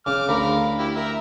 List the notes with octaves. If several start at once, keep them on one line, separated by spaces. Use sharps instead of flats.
C#3 D6 F6
D2 A#4 F5 B5
E4 G4
A#4 E5